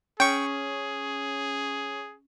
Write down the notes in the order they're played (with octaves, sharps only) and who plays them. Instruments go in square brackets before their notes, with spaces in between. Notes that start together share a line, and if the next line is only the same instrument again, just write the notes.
[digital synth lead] C#4 [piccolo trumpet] G#4 [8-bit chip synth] G5 C#6